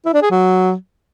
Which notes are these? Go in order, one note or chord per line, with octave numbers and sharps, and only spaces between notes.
E4
D4
G#4
F#3